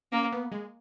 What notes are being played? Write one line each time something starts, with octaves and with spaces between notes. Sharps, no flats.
A#3 C#4
B3
G#3